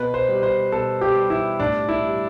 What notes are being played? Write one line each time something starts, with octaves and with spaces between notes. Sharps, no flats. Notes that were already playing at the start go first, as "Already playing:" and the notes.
Already playing: B2 B4
C5
G3
C5
B2 A4
G4
G3
E4
A2 D4
E4
G3